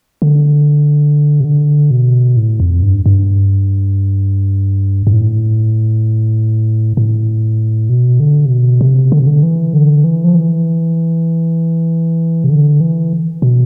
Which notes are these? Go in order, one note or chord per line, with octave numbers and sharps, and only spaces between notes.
D3
C3
D3
B2
A2
F2
G2
G2
G2
A2
A2
B2
D3
C3
B2
C3
D3
C3
D3
E3
D3
E3
F3
E3
C3
D3
E3
B2